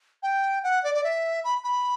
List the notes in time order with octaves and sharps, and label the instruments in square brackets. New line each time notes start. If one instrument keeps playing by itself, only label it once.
[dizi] G5
F#5
D5
D5
E5
B5
B5